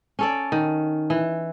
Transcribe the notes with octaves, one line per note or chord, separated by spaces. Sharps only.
C#4 A4 D5
D#3
E3